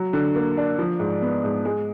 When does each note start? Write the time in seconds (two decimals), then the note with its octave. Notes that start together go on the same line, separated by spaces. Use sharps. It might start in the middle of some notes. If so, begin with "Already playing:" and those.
Already playing: F#3
0.13 D3
0.35 A#3
0.57 D4
0.79 F3
1.00 G#2
1.22 B3
1.44 G#2
1.65 G#3